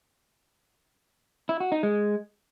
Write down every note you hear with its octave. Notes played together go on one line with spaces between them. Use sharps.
E4
F#4
D#4
G#3